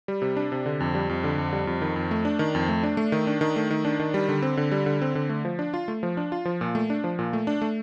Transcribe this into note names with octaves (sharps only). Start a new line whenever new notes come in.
G3
C3
D4
C3
D3
F2
G3
F2
D3
F2
G3
F2
D#3
F2
A3
D4
D#3
F2
A3
D4
A3
D#3
D4
D#3
A3
D#3
D4
D#3
G3
D3
C4
D3
G3
D3
C4
D3
A3
F3
D4
F4
A3
F3
D4
F4
F3
A#2
A3
D4
F3
A#2
A3
D4
A3